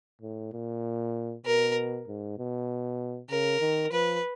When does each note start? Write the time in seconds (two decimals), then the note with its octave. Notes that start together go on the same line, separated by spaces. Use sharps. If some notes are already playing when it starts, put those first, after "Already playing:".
0.22 A2
0.53 A#2
1.46 B2 A#4
2.08 G#2
2.38 B2
3.30 C#3 A#4
3.61 D#3
3.91 F3 B4